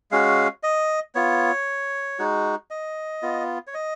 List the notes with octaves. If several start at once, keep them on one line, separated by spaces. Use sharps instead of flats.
G#3 C#4 F#4 F5
D#5
B3 F4 C#5
G#3 D#4 F#4
D#5
B3 F4
C#5
D#5